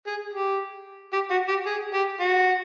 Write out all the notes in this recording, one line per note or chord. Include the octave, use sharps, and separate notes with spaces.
G#4
G4
G4
F#4
G4
G#4
G4
F#4